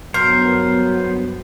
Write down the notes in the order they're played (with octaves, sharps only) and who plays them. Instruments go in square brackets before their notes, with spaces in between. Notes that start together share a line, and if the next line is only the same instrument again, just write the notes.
[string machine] G2 B3 [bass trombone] F#3 [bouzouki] A#4 [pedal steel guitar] C5